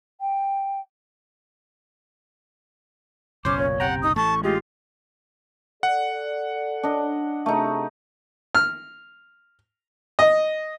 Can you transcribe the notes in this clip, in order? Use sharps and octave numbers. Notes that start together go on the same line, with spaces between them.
G5
F#1 B1 C#4 C5 D6
A#2 C#5
C3 F#5 G5 A#5
D#4 D#6
A1 A3 A5 C#6
G#3 F4 G4 D#5
A4 D5 F#5
D4 D#5
C3 A3 D#4 G#4
F6
D#5